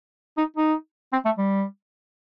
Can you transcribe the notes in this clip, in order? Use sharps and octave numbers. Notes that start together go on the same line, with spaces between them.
D#4
D#4
C4
A3
G3